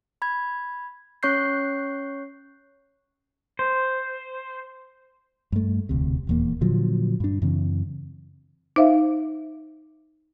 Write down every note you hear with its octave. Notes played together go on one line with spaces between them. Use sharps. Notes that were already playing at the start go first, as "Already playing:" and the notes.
B5 G#6
C#4 C#5 C#6 F#6 G6 C7
C5
G2 A3
E1 D2 C3
D#1 E2 A#3
A#2 D3 F3 F#3
G2 D4
F#2 C#3 E3 C4
D#4 C5 E5 F5